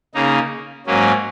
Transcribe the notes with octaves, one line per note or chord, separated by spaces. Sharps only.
C#3 A#3 D#4
G#2 F#3 A#3 C#4